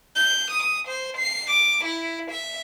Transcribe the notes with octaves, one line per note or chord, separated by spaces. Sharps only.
G6
D#6
C5
C7
D6
E4
E5